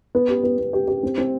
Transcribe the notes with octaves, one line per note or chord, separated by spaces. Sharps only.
B3
G4
B3
B3
G4
G4
C4
C4